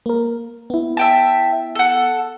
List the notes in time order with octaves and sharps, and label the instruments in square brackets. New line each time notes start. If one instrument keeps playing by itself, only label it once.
[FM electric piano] A#3 A#4
B3 E4
[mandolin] E5 G5 A5
A4 F#5